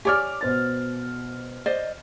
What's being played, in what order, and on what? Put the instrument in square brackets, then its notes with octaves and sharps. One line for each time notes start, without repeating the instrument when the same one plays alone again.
[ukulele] G4 C#5 D5 [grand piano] G#5 D6 F6
[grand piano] B2 C5 A6
[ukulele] C5 D5 D#5